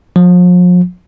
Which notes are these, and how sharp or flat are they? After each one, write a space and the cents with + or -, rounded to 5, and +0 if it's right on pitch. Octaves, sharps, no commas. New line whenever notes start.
F3 +40